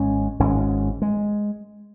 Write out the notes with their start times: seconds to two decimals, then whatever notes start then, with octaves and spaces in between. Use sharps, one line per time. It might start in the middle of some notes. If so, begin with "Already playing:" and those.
Already playing: G#1 G#2 G#3 C#4
0.40 G#1 G#2 G#3 C#4
1.02 G#3